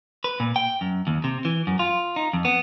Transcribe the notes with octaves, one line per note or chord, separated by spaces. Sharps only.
B4
A#2
G5
F#2
D#2
C3
E3
F#2
F4
D#4
F2
B3